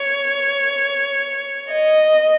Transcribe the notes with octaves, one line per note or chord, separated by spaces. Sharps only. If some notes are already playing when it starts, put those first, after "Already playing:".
Already playing: C#5
D#5